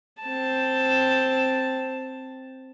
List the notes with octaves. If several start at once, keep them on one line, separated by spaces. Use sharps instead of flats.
C4 A5